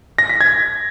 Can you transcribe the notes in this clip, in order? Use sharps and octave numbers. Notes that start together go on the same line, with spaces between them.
A#6
B6
G#6